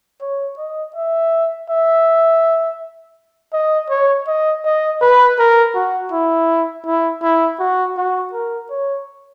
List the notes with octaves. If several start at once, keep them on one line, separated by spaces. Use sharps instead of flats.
C#5
D#5
E5
E5
D#5
C#5
D#5
D#5
B4
A#4
F#4
E4
E4
E4
F#4
F#4
A#4
C#5